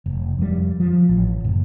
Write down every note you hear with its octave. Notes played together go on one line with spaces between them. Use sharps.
F1
F2 G3
F3
A1
F#1